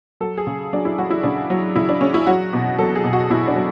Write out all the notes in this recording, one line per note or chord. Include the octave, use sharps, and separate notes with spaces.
F#3 A4
G#4
C#3
F#3 D4
E4
F#3 F#4
E4
C#3 D4
F#3
C#3 E4
D4
C#3 C#4
E4
F#3 F#4
B2
F#3 A4
G#4
B2
F#4
B2 E4
D4
F#3